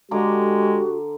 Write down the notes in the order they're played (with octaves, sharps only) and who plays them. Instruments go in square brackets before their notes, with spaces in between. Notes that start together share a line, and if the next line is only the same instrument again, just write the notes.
[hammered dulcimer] D3 A#5 D6 [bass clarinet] G#3 [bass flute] F#4 [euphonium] G4